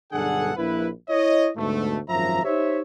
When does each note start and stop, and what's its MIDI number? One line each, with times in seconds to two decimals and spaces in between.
0.12 0.52 35
0.12 0.52 43
0.12 0.52 50
0.12 0.52 68
0.12 0.52 69
0.12 0.52 78
0.56 0.87 34
0.56 0.87 64
0.56 0.87 71
1.08 1.49 64
1.08 1.49 73
1.08 1.49 75
1.56 1.98 38
1.56 1.98 44
1.56 1.98 47
1.56 1.98 57
2.09 2.43 32
2.09 2.43 42
2.09 2.43 53
2.09 2.43 76
2.09 2.43 82
2.44 2.81 63
2.44 2.81 67
2.44 2.81 72
2.44 2.81 73
2.44 2.81 76